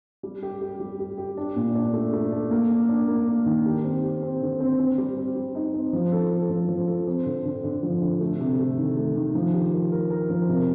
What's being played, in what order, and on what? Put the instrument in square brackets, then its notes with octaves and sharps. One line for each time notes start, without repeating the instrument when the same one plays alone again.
[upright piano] G3
G4
G4
G3
G4
G4
D4
A#2
D4
A3
A3
D4
A#3
D4
D4
A#3
A#3
D#3
G4
C4
G4
C4
D3
C4
C4
G3
C4
G3
D#4
C4
F3
A4
A4
F3
F3
A4
C4
D3
D3
D3
F3
D3
A3
C3
A3
D#3
A3
D#3
F3
G4
A#4
A#4
A#4
F3
C3